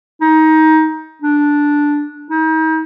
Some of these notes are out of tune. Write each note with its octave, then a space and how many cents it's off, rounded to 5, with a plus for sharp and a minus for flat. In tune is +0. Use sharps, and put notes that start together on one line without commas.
D#4 +20
D4 -5
D#4 +40